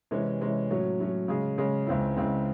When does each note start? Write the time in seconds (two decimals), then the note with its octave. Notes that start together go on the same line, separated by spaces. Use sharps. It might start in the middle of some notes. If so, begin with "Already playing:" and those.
0.11 C3 E3 G#3 C#4
0.41 C3 E3 G#3 C#4
0.70 A2 F#3 C#4
1.00 A2 F#3 C#4
1.28 C#3 G#3 C#4 G#4
1.58 C#3 G#3 C#4 G#4
1.87 C#2 C#3 G#3 C4 E4
2.16 C#2 C#3 G#3 C4 E4